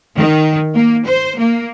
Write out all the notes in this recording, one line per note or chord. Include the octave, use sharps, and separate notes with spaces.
D#3
A#3
C5
A#3